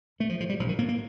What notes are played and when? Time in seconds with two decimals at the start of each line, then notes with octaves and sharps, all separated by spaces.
0.19 A#1 A3
0.29 F3
0.40 A2 F3
0.49 G3
0.59 A#1 F3
0.69 D#3
0.78 A2 A#3
0.89 A#3